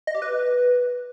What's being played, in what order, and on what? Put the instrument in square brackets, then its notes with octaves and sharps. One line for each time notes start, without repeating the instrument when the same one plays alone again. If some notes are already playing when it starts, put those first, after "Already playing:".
[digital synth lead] D#5
G4
B4